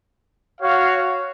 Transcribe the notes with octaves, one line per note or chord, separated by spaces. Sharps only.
F#4 C#5 F5